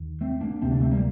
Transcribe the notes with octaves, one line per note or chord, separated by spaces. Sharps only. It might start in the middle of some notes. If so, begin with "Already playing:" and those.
Already playing: D#2
A3 C4
A#3 D4
D2 C3 A3 C4
A#3 D4
A3 C4
G3 A#3